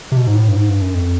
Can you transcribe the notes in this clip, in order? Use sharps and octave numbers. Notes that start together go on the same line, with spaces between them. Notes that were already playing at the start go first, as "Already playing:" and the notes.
C3
B2
G#2
A2
G2
G#2
G2
F#2
F2